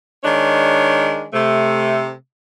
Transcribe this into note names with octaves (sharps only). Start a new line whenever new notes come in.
D#3 G#3 D4 C#5
C3 A3